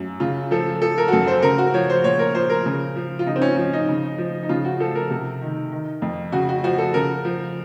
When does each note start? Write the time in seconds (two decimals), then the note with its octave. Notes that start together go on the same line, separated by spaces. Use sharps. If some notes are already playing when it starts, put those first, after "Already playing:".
Already playing: F#2
0.20 C#3 F4
0.51 F3 A4
0.81 F3 A4
0.98 A#4
1.08 F#4
1.12 F#2 A4
1.27 C5
1.43 C#3 A#4
1.58 F#4
1.74 F3 C#5
1.90 C5
2.04 A#2 C#5
2.19 A#4
2.35 F3 C5
2.50 A#4
2.66 C#3
2.96 F3
3.19 F4
3.26 C#3 D#4
3.36 C4
3.42 C#4
3.57 F3 C#4
3.73 D#4
3.89 C#3
4.18 F3
4.43 D#4
4.49 C#3 F4
4.65 F#4
4.80 F3 A4
4.95 A#4
5.10 C3
5.41 D#3
5.72 D#3
6.02 F2
6.32 C#3 F#4
6.49 F#4
6.64 F3 F#4
6.78 A4
6.94 C#3 A#4
7.25 F3